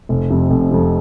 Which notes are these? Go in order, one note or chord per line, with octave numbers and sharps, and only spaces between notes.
F1
F2 C3
F1
F2 C3